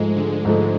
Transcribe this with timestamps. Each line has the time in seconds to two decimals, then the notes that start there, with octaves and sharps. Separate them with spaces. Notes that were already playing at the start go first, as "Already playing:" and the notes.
Already playing: G#2 F3 G#3 A3
0.16 D3
0.45 G#2 F3 A3